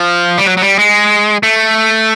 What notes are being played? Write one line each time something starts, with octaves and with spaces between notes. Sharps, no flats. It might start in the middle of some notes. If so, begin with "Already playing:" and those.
Already playing: F3
G3
F#3
F#3
G3
G#3
A3